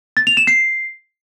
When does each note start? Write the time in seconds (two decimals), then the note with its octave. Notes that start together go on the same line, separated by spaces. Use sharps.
0.17 A6
0.27 F7
0.37 E7
0.47 C7